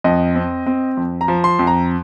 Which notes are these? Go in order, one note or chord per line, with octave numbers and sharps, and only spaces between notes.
F2 D#5
C4
C4
F2
A#5
F3
C6
F2
A#5